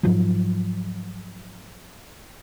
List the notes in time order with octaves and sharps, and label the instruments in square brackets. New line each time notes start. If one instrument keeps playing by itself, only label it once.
[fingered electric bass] G#2 F3 F#3